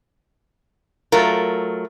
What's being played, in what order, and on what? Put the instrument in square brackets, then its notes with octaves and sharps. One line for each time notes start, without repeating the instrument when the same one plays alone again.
[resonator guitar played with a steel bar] F#3 A3 F4 A#4